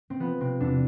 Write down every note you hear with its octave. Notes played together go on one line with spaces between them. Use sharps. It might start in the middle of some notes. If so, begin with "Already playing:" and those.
C4
F3 B3
C3 C4
E2 D4